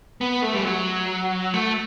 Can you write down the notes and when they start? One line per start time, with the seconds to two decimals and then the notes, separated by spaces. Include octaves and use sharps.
0.21 B3
0.42 A3
0.54 G3
0.64 F#3
1.54 A3